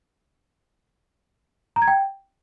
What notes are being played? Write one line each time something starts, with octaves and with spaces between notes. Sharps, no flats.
A#5
G#6
G5